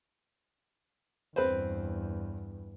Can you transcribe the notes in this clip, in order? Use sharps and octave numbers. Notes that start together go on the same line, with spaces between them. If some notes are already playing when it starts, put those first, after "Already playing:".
E2 G2 C4 B4 C5